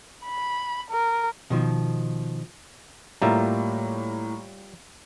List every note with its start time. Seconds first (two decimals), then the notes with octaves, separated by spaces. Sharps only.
0.24 B5
0.90 A#4
1.50 B2 D#3 F3
3.22 A2 G3 A#3 F4 E5 A#5